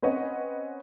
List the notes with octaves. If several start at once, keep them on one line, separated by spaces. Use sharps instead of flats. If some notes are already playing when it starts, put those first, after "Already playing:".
C4 C#4 B4 C#5 D#5 F#5